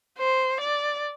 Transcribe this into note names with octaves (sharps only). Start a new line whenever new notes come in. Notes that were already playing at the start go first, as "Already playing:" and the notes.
C5
D5